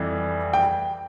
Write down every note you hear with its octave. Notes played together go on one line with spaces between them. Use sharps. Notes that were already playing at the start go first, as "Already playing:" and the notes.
Already playing: F2 E3 G3
G5